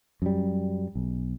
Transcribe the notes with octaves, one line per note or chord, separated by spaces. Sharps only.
F#2 G3
B1